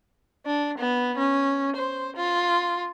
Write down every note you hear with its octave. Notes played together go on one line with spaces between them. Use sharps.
D4
B3
C#4
C5
F4